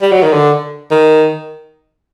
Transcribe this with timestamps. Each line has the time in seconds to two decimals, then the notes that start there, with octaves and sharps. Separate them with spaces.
0.02 G3
0.12 F#3
0.22 D#3
0.33 D3
0.91 D#3